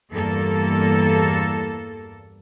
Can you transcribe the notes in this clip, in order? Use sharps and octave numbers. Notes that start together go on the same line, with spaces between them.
E2 G2 A#3 A4